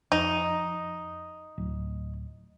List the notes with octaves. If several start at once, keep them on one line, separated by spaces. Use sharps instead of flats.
F2 D#4
D1